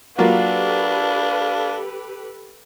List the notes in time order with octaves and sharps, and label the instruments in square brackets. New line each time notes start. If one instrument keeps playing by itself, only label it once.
[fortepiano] F#3 A#3 F4 [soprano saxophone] D4 [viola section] G4 A4 B4 [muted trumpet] F5